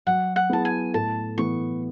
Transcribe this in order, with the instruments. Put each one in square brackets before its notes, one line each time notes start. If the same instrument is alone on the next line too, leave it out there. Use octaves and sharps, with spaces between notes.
[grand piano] F#3 [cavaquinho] F#5
[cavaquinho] F#5
[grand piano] B3 E4 G#4 [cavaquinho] A5
[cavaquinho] G#5
[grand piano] A2 [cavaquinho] A5
[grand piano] E3 B3 [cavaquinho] C#6